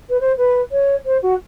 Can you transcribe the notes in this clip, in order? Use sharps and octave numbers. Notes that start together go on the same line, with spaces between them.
B4
C5
B4
C#5
C5
F#4